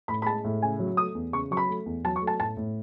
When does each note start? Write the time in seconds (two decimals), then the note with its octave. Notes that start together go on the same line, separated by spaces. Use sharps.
0.08 A2 B5
0.22 B5
0.26 G#3 A5
0.44 A2
0.62 C#3 G#5
0.79 F#3
0.97 A3 D#6
1.15 E2
1.33 C#3 C#6
1.51 F#3 C#6
1.57 B5
1.69 A3
1.86 E2
2.04 F#3 A5
2.16 C#6
2.22 A3
2.27 A5
2.40 A2 A5
2.57 A2